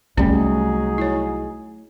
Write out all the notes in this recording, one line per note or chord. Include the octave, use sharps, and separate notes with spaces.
C2 F#3 G3 A3 C#4 D#4 G#4
E4 C#5